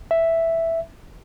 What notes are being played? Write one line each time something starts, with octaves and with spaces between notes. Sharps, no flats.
E5